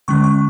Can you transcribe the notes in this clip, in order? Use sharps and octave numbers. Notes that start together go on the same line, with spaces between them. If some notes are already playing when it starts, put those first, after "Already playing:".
D3 G#3 C#4 C#6
C#6